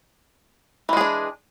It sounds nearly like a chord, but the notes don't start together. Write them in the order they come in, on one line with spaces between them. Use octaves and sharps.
E3 G#3 G#4 D4